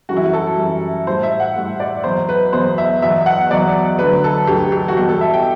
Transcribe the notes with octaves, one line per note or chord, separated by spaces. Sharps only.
F#2 E3 G3 F#4
E4
F#4
A4
F#2 E3 G3
A2 G3 C5
E5
F#5
A2 G3
D5
E2 B2 F#3 C5
B4
E2 B2 F#3 C5
E5
E2 B2 F#3 E5
F#5
E2 B2 F#3 D5
D2 D3 F#3 B4
A4
D2 D3 F#3 G4
G4
F#4
E2 B2 G3 G4
A4
E5
G5